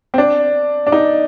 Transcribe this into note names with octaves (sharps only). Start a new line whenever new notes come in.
C4
D4
D4
D#4